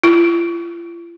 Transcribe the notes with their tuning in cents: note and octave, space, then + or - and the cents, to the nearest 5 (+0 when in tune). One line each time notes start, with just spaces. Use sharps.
F4 -45